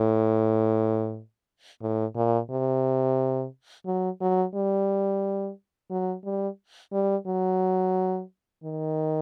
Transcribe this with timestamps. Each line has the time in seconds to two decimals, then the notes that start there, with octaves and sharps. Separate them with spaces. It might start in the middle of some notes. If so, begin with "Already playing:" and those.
Already playing: A2
1.82 A2
2.16 A#2
2.50 C3
3.86 F#3
4.21 F#3
4.55 G3
5.91 F#3
6.25 G3
6.93 G3
7.27 F#3
8.64 D#3